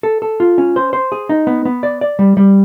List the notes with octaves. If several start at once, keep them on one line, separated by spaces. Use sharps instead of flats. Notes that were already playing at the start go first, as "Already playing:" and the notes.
A4
A4
F4
C#4
C5
C5
G#4
D#4
B3
B3
D5
D5
G3
G3